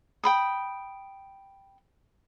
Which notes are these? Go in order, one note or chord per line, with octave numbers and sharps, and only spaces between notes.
G5 B5 D#6